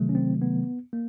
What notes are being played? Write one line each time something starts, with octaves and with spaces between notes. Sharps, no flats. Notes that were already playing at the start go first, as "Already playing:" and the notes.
Already playing: C3 D#3 F#3 A3
C#4
C4
B3
A#3